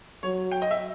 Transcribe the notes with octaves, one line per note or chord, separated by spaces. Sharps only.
F#3 C#5
G5
D#5
E5